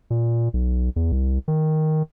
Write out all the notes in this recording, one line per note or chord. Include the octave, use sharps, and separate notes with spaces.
A#2
B1
E2
C2
D#3